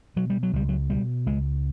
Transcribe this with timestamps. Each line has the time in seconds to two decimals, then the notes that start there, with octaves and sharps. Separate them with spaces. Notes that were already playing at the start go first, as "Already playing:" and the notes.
0.16 B2 F#3
0.30 G3
0.43 F#3
0.53 C#2 G3
0.69 F#3
0.90 B2 G3
1.26 C#2 G#3